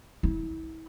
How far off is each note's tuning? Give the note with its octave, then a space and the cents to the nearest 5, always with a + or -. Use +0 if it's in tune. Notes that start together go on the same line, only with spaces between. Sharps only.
E4 -35